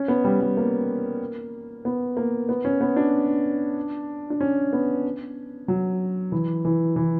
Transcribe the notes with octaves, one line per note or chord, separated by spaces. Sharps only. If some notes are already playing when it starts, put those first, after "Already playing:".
Already playing: C#4
B3
G3
G3
A#3
B3
A#3
B3
C#4
B3
D4
D4
C#4
B3
F#3
E3
E3
E3